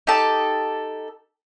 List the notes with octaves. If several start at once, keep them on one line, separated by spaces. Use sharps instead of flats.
D#4 G4 A4 A5